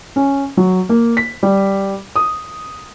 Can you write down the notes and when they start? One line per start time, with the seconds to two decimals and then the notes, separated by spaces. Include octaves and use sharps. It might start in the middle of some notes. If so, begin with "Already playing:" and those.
0.16 C#4
0.57 F#3
0.89 A#3
1.17 B6
1.43 G3
2.16 D#6